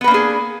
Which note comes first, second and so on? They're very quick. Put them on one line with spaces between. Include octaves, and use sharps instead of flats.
B3 B4 A#3 D4 G#4